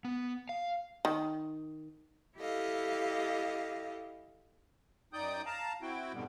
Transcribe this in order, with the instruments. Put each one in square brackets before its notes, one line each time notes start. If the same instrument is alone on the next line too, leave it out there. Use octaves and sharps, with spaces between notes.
[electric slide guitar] B3
F5
[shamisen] D#3
[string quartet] E4 G4 A4 D#5 F5
[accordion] F#2 D#4 D5 G5 D#6 G6
F5 A5 A#5
C4 E4 F#4 G5
F2 G#2 B2 D3 G3 B3